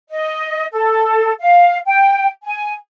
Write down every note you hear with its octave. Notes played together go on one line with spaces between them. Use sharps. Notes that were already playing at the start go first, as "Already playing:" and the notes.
D#5
A4
F5
G5
G#5